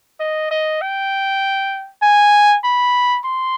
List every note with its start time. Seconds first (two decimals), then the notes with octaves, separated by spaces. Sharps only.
0.20 D#5
0.51 D#5
0.81 G5
2.02 G#5
2.64 B5
3.25 C6